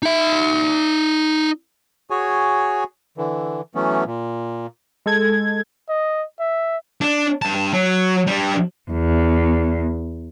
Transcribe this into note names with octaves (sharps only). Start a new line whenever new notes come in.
D#4 E5
F#4 G#4 C#5 G#5
D3 E3
E3 F#3 A3 B3 C#4
A#2
G#3 A4 G#6
D#5
E5
D4
G2 A5
F#3
G3 D4
E2